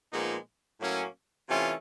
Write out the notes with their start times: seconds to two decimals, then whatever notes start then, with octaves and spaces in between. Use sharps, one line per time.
0.12 A#2 F3 G#3 B3 D#4
0.80 A2 F#3 A#3 C#4
1.49 C3 E3 A3 C#4 F4